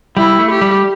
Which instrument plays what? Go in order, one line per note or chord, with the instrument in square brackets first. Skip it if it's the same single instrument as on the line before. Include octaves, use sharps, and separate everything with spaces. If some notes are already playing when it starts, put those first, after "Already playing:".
[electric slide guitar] G3 [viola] E4
[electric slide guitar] A3
[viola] G4
[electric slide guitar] G3